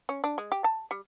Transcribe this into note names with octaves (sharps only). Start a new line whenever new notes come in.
C#4
D4
G#3
G4
A5
G3